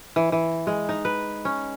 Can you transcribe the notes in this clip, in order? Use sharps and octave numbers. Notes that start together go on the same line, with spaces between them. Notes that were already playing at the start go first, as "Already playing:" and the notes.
E3
E3
G#3
D#4
B4
C#4